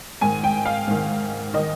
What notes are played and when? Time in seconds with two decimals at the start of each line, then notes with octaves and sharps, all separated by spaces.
0.21 G#2 D#3 G#5
0.44 G5
0.65 F5
0.88 G#2 D#3
1.54 D#3 D#5